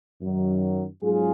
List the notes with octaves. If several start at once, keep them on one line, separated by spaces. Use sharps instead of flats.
F#2 D#3 F#3
G#2 F#3 C#4 F4 G#4